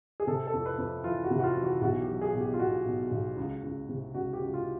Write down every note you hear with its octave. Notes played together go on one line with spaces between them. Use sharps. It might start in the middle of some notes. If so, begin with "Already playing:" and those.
G#4
C3 A4
A4
F2
B4
F2
E3 F4
F#4
C3
F#4
F4
E3
F#4
B1 F#4
G4
F#3
G#4
B2
G4
F4
B2 F#4
B2
B1
C#2
C#2
C3
C#2 F#4
G4
C#2
F4